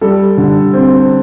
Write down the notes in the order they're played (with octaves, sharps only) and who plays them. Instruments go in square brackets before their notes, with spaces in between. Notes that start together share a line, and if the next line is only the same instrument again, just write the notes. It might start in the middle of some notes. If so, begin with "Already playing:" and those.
[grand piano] G3 A4
D3
C4